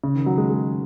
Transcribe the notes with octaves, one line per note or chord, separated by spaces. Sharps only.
C#3
D#3
F#3
G#3
G#3